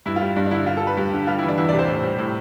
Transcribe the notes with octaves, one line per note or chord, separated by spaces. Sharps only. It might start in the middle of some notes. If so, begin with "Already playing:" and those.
G2 E4
F4
G3
G2 D4
D4
D3 E4
G2 F4
A4
G3
B4
G2 G4
D3
G3 F4
E4
E3
D4
E2 E4
D5
C3
C5
A2
G3
A2